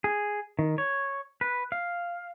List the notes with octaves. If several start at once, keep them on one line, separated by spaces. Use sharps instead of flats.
G#4
D#3
C#5
B4
F5